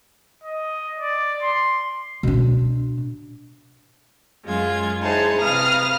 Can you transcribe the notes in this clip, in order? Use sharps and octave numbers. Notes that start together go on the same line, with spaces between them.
D#5
D5
C6
B2 D4
F#2 G#3 F4 G#6
D#4 E4 G#4 C5 C#5 A5
C3 B4 F5 D#6 F6